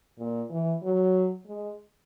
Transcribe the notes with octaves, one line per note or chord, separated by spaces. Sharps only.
A#2
E3
F#3
G#3